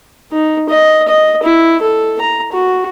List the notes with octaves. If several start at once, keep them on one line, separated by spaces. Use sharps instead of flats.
D#4
D#5
D#5
E4
A4
A#5
F#4